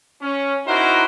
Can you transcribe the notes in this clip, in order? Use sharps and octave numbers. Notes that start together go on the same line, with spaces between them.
C#4
D#4 E4 F#4 A#4 C5